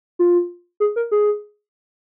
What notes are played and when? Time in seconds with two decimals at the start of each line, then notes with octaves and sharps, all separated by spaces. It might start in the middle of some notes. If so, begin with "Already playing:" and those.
0.19 F4
0.80 G#4
0.96 A#4
1.11 G#4